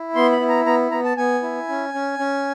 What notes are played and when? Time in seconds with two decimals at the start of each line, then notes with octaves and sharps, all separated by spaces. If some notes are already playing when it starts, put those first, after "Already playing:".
Already playing: E4
0.15 B3 C6
0.32 B5
0.40 E4
0.49 A#5
0.66 B3 A#5
0.91 B3 A#5
1.04 A5
1.17 B3 G#5
1.43 E4
1.69 C#4
1.94 C#4
2.19 C#4